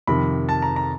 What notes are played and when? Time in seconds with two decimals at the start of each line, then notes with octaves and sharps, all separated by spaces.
0.07 F2 C3 D#3 B5
0.49 A5
0.62 A#5
0.76 A#5